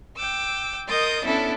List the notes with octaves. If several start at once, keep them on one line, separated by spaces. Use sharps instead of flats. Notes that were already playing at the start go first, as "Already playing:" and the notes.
G5 D6 E6
A#4 D#5 C6 D#6 G6 A6
B3 C#4 D4 E4 A4